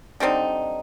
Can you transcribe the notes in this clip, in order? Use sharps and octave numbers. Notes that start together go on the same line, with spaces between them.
D3 G3 C4 D#4